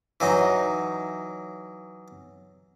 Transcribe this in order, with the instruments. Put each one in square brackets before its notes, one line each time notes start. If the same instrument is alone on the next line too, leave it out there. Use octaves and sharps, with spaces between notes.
[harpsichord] E3 F#3 D#4